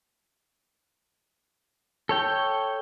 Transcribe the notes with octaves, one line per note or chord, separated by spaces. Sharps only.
A4 C#5 G5